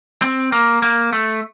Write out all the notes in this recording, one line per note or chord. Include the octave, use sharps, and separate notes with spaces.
C4
A#3
A#3
A3